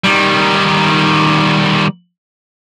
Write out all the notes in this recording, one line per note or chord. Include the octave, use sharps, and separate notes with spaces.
D#3 G3